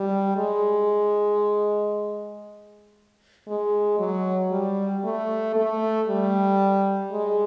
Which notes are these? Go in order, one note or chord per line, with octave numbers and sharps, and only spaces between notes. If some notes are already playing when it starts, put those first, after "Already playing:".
Already playing: G3
G#3
G#3
F#3
G3
A3
A3
G3
G#3